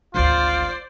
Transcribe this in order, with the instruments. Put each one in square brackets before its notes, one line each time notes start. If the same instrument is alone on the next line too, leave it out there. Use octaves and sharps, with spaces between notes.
[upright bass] G#1 D2 [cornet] F4 [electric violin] C5 D5